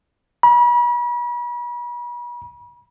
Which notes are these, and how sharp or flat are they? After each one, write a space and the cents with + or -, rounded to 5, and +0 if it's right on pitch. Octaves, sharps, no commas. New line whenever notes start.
B5 -40